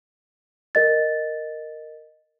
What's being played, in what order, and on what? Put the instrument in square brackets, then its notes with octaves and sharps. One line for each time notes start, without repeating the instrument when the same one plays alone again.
[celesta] A#4 D#5 A6